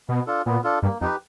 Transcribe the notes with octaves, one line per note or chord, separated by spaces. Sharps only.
B2 B3
D4 F4 A4
A#2 B3
D4 F4 A4
G2 A#3
F2 D#4 G4 B4